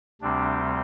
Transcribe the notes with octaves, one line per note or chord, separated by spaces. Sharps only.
D2 C3 G3 C4 D4